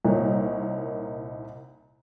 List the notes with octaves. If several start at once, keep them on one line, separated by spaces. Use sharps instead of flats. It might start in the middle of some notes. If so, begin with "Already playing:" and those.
C2 A#2 A#3 D#4 C#5